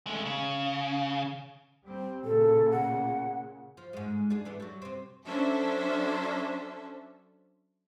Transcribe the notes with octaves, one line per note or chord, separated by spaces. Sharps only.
G#3 A3
C#3
G3 C4
A#2 C#3 A4
F#5
F3
G#2 G#3
D4 G#4
E3 B3 D4
F#3 G3
C3 C4
F#3 C#4 D4 A4 C5 E5